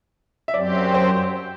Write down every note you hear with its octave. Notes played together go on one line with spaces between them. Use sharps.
E5
F#2 F#3 C4 G4 D5
C5